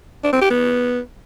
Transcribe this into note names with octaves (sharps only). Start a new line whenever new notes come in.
D4
C4
G4
B3